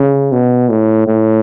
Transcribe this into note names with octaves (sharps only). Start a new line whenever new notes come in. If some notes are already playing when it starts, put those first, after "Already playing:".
Already playing: C#3
B2
A2
A2